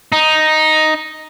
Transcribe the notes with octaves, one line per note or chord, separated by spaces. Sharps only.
D#4